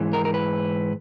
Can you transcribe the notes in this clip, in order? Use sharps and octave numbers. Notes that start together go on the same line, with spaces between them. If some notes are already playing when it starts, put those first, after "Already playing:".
Already playing: G#2 E3
A#4
A#4
B4